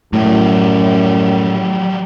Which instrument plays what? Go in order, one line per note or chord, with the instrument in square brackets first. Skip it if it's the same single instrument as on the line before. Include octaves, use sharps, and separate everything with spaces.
[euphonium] F#2 [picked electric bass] A2 [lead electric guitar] F#3 G3